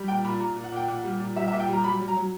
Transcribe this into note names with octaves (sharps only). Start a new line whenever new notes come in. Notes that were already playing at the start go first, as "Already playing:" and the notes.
Already playing: G3
A#2 G5
A#2 B5
A#2 A#5
A#2
F#5
A#2 G5
A#2 F#5
G3
A#2
G3 E5
E5
A#2
G5
G3 A#5
F#3 B5
F#3
A#5
F#3